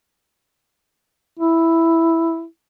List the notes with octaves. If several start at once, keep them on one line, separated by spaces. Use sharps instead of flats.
E4